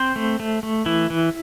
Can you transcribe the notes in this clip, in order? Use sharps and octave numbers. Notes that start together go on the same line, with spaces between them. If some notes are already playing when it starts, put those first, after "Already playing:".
Already playing: C4 C5
A3
A3
A3
E3 E4
E3